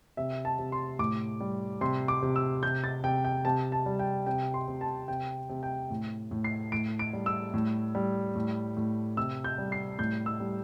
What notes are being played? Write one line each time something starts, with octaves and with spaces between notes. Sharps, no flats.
C3 E5
A5
C3
C6
A2 D6
G3
C3 C6
D6
C3
E6
C3 G6
A6
C3 G5
G5
C3 A5
A5
G3
G5
C3 G5
C6
C3
A5
C3 G5
C3
G5
A2
A2
C7
A2 D7
D7
G3
E6
A2
G3
A2
A2
C3 E6
G6
G3
C7
A2 G6
E6
G3